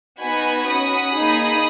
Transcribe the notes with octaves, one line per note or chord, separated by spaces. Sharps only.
B3 D#4 F#4 G#5 B5
C#4 F#4 B5 D#6
A#3 D#4 G#4